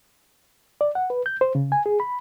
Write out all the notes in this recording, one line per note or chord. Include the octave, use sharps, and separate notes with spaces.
D5
F#5
B4
G6
C5
C#3
G#5
G#4
B5